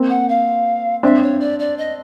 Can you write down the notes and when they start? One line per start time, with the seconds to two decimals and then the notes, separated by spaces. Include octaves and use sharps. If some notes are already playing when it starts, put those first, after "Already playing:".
Already playing: A#3 C4
0.09 F#5
0.29 F5
1.03 C4 D4 E5
1.22 C#5
1.40 D5
1.59 D5
1.78 D#5